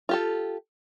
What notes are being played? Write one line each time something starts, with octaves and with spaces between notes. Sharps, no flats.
F4 G4 A4